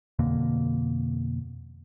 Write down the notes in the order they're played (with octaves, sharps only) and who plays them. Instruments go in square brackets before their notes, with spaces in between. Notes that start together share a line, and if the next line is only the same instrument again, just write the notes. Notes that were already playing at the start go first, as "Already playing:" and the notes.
[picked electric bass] F2 B2 D3 A#3